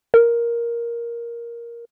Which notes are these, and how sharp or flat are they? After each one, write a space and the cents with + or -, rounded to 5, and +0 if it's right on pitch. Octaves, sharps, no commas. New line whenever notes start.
A#4 +10